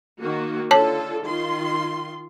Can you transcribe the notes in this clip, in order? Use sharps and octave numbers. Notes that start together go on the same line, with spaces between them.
D#3 A#3 F#4
D3 F4 A4 C#5 A5
D#3 F4 C6